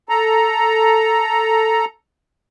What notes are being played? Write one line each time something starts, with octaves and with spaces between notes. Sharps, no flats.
A4 A#5